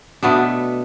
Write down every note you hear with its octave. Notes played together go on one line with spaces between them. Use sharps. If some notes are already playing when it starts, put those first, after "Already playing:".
B2 A3 B3 D4